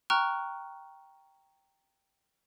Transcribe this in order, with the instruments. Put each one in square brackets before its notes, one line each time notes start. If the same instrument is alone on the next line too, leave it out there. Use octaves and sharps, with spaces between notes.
[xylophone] G5 A#5 C#6 F6 F#6